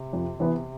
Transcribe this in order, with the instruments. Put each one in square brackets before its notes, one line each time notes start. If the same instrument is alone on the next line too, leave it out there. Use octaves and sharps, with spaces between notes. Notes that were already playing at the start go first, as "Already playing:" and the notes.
Already playing: [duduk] C3
[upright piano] F2
E3 B3